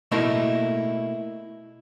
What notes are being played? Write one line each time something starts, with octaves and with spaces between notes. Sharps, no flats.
B2 A3 A#3 D#4 E4 A#4